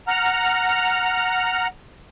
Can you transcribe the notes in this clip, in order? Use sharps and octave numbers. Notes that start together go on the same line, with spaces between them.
F#5 A#5 F6